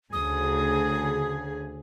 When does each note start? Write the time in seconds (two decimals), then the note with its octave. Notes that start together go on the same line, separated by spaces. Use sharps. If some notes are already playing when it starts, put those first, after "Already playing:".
0.13 D2 C#3 G#4 D#6